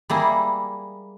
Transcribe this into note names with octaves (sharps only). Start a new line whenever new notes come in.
G3 A#3 E4 G#4